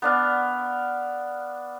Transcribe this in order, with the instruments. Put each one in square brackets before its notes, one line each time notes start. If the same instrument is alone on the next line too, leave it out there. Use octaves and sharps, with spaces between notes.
[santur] B3 D4 F5